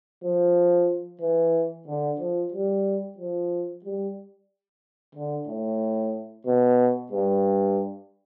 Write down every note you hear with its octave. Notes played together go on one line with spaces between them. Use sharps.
F3
E3
D3
F3
G3
F3
G3
D3
A2
B2
G2